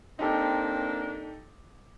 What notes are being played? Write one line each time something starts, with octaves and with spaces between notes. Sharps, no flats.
A#3 C4 D4 D#4 G4 A4